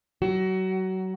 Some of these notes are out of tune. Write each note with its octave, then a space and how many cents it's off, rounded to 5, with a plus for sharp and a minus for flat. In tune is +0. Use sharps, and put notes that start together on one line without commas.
F#3 +25 F#4 +25